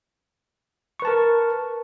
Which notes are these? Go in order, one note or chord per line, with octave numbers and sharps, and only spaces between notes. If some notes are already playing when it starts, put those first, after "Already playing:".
A#4 B4 A5 C#6